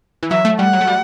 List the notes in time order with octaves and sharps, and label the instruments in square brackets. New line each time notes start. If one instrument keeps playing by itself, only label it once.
[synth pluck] E3
[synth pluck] F#3 [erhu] E5
[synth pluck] A3
[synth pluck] G3 [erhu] F#5
[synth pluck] F#3
A3
G3